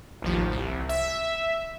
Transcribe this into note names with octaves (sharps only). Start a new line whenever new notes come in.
A1 D#2 F3
C2
E5